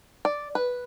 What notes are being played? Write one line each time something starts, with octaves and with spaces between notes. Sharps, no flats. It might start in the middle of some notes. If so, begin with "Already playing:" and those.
D5
B4